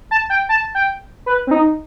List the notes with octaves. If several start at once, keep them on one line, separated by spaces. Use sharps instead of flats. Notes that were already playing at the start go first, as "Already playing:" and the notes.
A5
G5
A5
G5
B4
C4
D#4